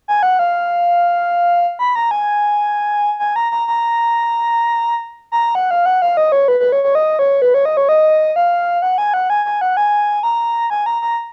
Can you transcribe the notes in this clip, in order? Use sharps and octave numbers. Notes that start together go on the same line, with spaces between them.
G#5
F#5
F5
B5
A#5
G#5
G#5
A#5
A#5
A#5
A#5
F#5
F5
F#5
F5
D#5
C#5
B4
B4
C#5
C#5
D#5
C#5
B4
C#5
D#5
C#5
D#5
F5
F#5
G#5
F#5
G#5
G#5
F#5
G#5
A#5
G#5
A#5
A#5